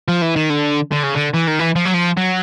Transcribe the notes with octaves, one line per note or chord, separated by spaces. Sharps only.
F3
E3
D#3
D3
D3
C#3
D3
E3
D#3
E3
F3
F#3
F3
F#3